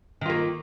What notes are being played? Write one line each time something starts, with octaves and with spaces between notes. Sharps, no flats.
D#3 A#3 F4